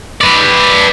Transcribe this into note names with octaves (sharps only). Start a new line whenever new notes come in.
B4 D5